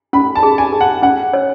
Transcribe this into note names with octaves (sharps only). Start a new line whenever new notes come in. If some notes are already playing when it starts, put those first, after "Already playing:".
C#4 B5
A5
G#4
G#5
G#4
F#5
C#4 F#5
C#5